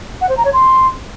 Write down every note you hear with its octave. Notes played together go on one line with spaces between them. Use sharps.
F#5
C5
A#5
C#5
C6